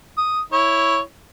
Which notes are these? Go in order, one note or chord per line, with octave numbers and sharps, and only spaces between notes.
D#6
E4 C#5